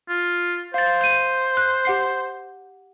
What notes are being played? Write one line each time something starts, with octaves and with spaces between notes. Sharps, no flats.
F4
C5 F5 A6
G6 D#7
F#6
G4 F#5 C7